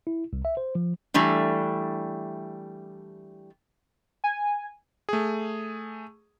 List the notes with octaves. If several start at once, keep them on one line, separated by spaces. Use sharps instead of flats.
E4
C2
E5
C5
F3
E3 G3 A3 D4
G#5
A3 G#4